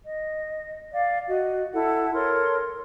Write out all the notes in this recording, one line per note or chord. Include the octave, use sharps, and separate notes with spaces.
D#5
D5 F5
F#4 D#5
E4 A4 F#5
A4 A#4 C#5 C6